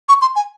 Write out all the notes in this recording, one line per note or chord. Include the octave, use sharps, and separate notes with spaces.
C#6
C6
G#5